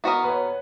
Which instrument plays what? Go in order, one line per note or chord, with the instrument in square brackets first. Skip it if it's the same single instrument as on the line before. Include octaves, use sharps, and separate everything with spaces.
[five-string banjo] B3 F#4 A#4 D#5
[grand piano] B4
C#5